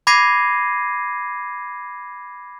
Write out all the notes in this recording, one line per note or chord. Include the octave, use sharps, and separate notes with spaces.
B5 D6 G#6 A#6 C7 D#7